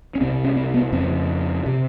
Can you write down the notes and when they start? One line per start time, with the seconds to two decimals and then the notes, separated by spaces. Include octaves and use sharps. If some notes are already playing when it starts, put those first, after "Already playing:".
0.15 C#4
0.20 C2 C3 C4
0.44 C#4
0.56 C4
0.74 B3
0.92 F2 C#3 C4
1.66 C3